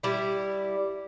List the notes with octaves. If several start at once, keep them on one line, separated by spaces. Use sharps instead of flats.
G3 E4